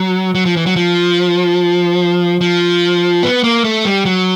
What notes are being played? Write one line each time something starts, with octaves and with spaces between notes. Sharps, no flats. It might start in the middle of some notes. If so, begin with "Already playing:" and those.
Already playing: F#3
F#3
F3
E3
F#3
F3
F3
B3
A#3
A3
G3
F#3